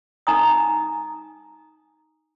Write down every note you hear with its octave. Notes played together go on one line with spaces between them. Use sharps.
D#4 G#5 A#5 D#6